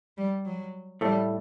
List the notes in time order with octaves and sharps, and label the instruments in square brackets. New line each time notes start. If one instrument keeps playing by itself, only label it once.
[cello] G3
F#3
[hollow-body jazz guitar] A2 A3 [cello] G3